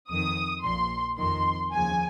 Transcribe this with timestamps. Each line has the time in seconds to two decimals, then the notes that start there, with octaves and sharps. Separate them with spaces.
0.10 F2 D#3 D#6
0.64 A#1 A#2 F3 C6
1.19 F2 D#3 C6
1.73 D#2 C#3 F3 G#5